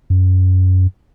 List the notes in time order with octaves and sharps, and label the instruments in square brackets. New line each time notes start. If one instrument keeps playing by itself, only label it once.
[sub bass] F#2